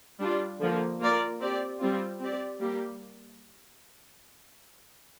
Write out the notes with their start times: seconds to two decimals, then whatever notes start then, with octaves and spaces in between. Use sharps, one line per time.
0.19 G3 D4 F4
0.60 D3 F3 A#3
0.99 A#3 F4 A#4 D5
1.40 C4 G4 D5
1.80 G3 C4 F4
2.20 C4 G4 D5
2.60 G3 A#3 G4